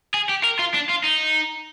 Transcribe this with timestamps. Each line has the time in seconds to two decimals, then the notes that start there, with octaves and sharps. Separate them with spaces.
0.14 G#4
0.29 G4
0.44 A#4
0.59 F4
0.74 D4
0.89 F4
1.04 D#4